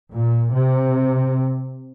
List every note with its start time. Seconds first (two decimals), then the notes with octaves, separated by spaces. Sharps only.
0.12 A#2
0.54 C3